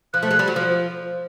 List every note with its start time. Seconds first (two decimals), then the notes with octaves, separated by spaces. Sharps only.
0.14 F3 F#6
0.23 A3
0.31 G#3
0.39 G3
0.48 F#3
0.56 F3